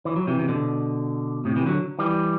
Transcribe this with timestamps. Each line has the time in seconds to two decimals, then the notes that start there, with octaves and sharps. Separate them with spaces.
0.05 E3
0.16 F#3
0.27 C3 E3
0.39 C3
0.49 B2 D3
1.45 A2 C3
1.56 C3 E3
1.66 D3 F#3
1.99 E3 G3